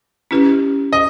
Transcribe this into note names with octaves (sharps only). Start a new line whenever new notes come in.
C#4 E4 G4 B4
D#5